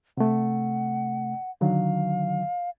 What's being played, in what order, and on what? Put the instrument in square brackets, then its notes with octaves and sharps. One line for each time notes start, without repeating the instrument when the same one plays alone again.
[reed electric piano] C3 A3 [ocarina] F#5
[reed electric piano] D3 D#3 F#3 [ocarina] F5